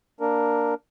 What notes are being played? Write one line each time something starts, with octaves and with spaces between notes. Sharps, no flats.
A#3 D4 A#4